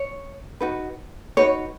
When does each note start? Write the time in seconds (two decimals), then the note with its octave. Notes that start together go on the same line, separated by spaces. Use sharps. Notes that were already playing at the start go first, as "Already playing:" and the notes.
Already playing: C#5
0.61 D#4 F#4 B4
1.37 D#4 F#4 B4 C#5